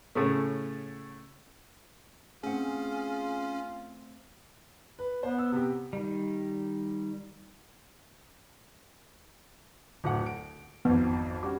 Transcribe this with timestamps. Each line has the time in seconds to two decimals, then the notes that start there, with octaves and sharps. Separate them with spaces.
0.15 A2 C#3 A3
2.44 A3 C4 C#4 F4 G#4 F#5
4.99 B4
5.23 B3 C5
5.38 E6
5.52 C3 G4
5.93 D#3 G3
10.04 D1 A2 F#5
10.26 D7
10.85 G#1 F2 B3
11.43 G3 C#4 F#4 D6